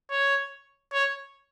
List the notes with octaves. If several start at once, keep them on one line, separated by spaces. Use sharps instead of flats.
C#5
C#5